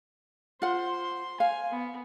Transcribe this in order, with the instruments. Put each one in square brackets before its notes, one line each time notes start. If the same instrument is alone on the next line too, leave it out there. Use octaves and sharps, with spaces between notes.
[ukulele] F4 F#5 [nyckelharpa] C5 C6
[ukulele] F5 [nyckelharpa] G#5
[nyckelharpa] B3